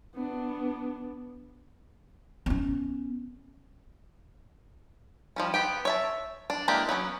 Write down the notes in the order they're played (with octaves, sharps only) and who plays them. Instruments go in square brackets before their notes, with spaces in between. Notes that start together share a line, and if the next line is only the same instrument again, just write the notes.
[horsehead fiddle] B3 D4
[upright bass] B3 C#4
[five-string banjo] F3 G3 C#4
B3 G4 G5
C#5 E5 A5
D4
E3 G#3 A#3 D4 G4
F#3 B3 C#4